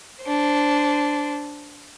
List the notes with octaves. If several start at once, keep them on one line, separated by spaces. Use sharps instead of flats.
D4 C5